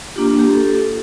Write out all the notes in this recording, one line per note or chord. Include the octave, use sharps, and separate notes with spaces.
A#3 D4 F4 G4
G4
A4